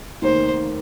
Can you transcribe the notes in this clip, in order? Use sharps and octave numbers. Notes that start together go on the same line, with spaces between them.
F1 D#2 D#3 C5